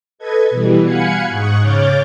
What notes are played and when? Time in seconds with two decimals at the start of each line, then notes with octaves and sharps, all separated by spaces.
0.18 A4 B4 D#5 G#6
0.50 B2 E3 G3
0.83 F5 F#5 G#5 B5 G#6 C#7
1.29 G#2 C#6 D#6 F#6
1.61 C#3 C#5 D6 F6 G6 A6